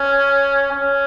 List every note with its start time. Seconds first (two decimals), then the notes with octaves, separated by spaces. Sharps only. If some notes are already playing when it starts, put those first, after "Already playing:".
Already playing: C#4
0.71 C#4